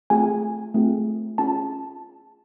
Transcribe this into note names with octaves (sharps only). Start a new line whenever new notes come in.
A3 C4 F4 G#4 G#5
A3 C4 F4 G#4
C#4 F4 G#4 A5